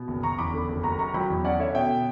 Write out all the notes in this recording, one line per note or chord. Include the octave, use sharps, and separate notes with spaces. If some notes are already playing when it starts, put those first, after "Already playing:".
Already playing: B2
F#1
F#1 A#5 C#6
E2 B5 D6
D3
F#1
F#1 A#5 C#6
F#2 A#5 C#6
F#3 G5 B5
E2
C#4 D5 F#5
D3 C#5 E5
B2 E5 G5